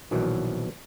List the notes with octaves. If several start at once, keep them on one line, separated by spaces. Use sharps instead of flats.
A#1 B2 D#3 E3 F#3